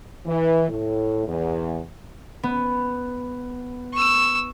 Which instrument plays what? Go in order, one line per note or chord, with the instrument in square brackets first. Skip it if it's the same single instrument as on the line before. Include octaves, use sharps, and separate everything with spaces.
[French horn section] E3
A2
E2
[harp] B3
[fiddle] C#6 E6